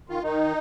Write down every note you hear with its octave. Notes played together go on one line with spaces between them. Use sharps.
D#3 F4
D#3 D#4